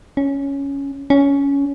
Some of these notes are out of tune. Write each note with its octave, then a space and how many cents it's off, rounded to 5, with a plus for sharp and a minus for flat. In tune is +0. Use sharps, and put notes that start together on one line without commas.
C#4 +5
C#4 +15